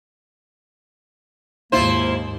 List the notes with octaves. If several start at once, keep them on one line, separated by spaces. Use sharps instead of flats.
D#2 G#2 A#3 E4 F4 C5 C6